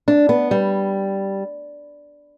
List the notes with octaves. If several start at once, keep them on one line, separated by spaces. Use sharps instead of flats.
D4
B3
G3